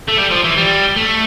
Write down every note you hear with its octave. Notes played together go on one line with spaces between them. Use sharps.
A3
G3
F3
E3
G3
A3